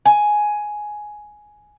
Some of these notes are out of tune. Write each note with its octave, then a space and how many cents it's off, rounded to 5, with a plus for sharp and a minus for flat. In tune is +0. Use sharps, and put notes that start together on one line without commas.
G#5 +10